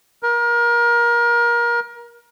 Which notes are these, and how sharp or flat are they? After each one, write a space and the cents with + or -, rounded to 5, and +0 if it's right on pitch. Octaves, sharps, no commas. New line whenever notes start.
A#4 +25